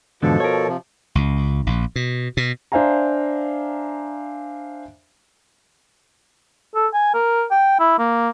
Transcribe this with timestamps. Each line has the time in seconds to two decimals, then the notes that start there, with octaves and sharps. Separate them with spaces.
0.22 E2 G#2 B2 D3 F3 A4
0.40 A#4 C#5
0.68 C3 F3
1.15 C#2
1.67 A#1
1.96 B2
2.37 B2
2.72 D4 C5 E5 F5 G#5 A#5
6.75 A4
6.94 G#5
7.14 A#4
7.51 G5
7.79 E4
7.99 A#3